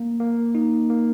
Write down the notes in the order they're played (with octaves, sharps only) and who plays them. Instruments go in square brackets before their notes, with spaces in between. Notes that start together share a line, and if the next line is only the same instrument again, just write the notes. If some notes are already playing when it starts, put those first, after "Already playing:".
Already playing: [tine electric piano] A#3
A#3
D#4
A#3